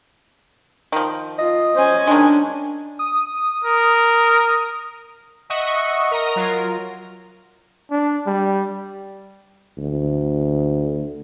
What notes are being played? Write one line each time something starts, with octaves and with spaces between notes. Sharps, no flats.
D#3 F3
F4 D#5
C#4 C5 G#5
D#3 G#3 D4
D#6
A#4
D#5 E5 F#5 C#6
A#4 D#5 A#5
F#3 F4 A#4
D4
G3
D2